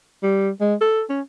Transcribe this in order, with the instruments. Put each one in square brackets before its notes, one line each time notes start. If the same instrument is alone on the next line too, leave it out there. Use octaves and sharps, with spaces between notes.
[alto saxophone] G3
G#3
A4
C#4